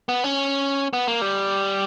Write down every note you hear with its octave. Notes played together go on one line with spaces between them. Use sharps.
B3
C#4
B3
A#3
G3